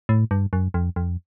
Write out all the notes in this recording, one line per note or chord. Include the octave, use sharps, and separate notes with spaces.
A2
G2
F#2
F2
F2